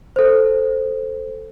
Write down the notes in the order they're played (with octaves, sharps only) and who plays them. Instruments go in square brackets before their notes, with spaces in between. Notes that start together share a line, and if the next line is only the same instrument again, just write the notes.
[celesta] A4 C5